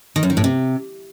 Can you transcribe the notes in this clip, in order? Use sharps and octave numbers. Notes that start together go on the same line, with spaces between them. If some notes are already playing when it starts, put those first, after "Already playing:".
D#3
F#2
D#3
A2
C3